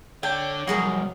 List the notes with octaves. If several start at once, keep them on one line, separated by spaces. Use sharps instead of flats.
D3 D4 C#5 G5
C2 F2 F#3 F#4 G#4 A#4